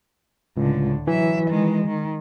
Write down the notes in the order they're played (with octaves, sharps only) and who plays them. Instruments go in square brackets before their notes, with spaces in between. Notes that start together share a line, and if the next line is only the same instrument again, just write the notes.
[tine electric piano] C#2 [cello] A2 D3
[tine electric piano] E3 [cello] F#3 E5
[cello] D#3 G#3
D#3